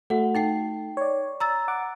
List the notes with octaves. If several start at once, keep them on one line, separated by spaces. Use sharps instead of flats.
A3 F#4 F#5
D#4 G5 C7
C#5 D5
A#5 E6 A6
F#5 D6